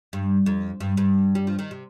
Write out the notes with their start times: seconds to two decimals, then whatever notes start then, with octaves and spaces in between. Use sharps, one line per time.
0.13 G2
0.46 F2
0.80 G2
0.97 G2
1.35 G3
1.47 F3
1.59 D#3
1.71 C3